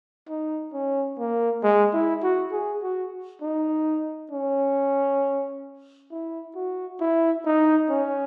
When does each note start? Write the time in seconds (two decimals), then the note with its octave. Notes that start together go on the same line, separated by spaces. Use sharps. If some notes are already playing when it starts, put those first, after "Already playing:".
0.29 D#4
0.73 C#4
1.19 A#3
1.63 G#3
1.94 E4
2.23 F#4
2.52 G#4
2.83 F#4
3.42 D#4
4.31 C#4
6.11 E4
6.55 F#4
7.00 E4
7.45 D#4
7.90 C#4